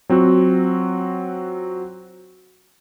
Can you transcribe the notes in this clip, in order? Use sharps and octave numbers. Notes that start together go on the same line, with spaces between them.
F#3 C4 F4 F#4